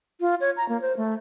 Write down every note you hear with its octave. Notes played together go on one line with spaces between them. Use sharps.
F4
C#5
A#5
A#3
C5
A3